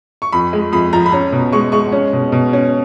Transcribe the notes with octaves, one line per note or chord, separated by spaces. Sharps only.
C#6
F2 B5
G#3
F2 B5
F3 A#5
B5
C#4 A#5
B2
G#3 C#6
G#3 C#6
C#4
B2
B2
C#4